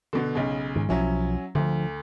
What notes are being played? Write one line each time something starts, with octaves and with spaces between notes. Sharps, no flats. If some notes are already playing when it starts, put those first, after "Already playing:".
B2 D3
B1 C#3
G#2 D#3
B1 F3 F#3 C#4 E4
D2 D3 D#3 F3